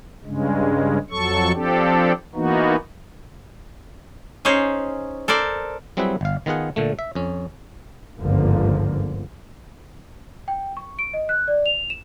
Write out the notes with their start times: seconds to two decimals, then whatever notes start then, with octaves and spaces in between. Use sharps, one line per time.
0.25 G2 C#3 G#3
1.11 F2 F#3 A4 C#6
1.54 F3 C4 D4 G4 A4
2.35 E3 A#3 B3 D#4 F#4
4.45 C#4 D#4 G#4 C5 C#5
5.28 A4 A#4 C5 D5
5.97 F#3 G3 C4 E4 G#4 B4
6.21 G1 F5
6.46 D#3 B3 F4 G#4 F#5
6.76 A#2 D3 A3
6.99 E5
7.15 F2 C#4
8.20 G1 C#2 G#2 D3 F3 A#3
10.48 G5
10.77 C#6
10.99 D7
11.14 D#5
11.29 F#6
11.48 D5
11.66 F7
11.90 E7